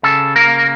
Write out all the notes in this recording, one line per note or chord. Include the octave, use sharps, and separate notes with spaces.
C#3 A4
A#3 A#4